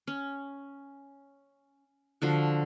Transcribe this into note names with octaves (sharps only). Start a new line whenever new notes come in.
C#4
D3 F3 F#4